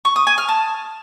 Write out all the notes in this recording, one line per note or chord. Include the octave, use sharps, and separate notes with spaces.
C#6
D#6
G#5
F6
A5